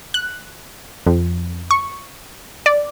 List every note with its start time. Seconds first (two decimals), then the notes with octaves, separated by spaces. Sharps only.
0.14 F#6
1.07 F2
1.71 C#6
2.66 D5